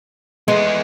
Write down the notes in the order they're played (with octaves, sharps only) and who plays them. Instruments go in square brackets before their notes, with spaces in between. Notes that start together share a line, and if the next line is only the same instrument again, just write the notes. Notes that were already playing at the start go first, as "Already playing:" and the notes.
[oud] G#3 [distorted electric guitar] B3 G#4